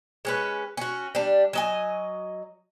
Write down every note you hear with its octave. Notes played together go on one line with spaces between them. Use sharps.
G#3 C#4 B4
C#4 F#4
G3 D4
F#3 D#5 G#5